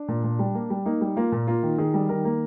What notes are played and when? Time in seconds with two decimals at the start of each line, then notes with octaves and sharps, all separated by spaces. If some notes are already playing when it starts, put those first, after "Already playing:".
Already playing: D4
0.08 A#2
0.24 A#2
0.39 G3
0.55 A#3
0.70 G3
0.86 A#3 D#4
1.01 G3
1.16 A#3 F4
1.32 A#2
1.47 A#3 F4
1.63 D#3
1.78 D#3 G#4
1.94 G3
2.09 D#3 A#4
2.25 A#3